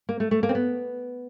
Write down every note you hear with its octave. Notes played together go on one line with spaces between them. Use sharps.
A#3
A3
A3
A#3
C4
B3